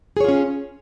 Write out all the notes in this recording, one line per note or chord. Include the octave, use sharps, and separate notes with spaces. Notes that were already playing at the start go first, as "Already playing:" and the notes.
C#4 F4 G#4 C#5